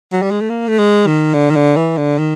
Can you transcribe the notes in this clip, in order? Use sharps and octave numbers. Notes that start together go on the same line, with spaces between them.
F#3
G3
G#3
A3
A#3
A3
G#3
D#3
D3
D#3
D3
E3
D3
D#3